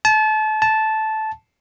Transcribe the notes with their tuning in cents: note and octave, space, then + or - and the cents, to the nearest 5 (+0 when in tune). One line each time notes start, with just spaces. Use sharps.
A5 -30
A5 -10